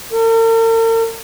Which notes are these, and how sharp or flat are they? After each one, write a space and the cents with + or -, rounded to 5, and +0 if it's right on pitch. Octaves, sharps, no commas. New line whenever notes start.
A#4 -45